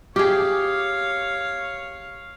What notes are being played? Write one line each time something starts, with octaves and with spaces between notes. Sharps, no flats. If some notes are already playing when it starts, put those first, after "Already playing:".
G4 G#4 C#5 F5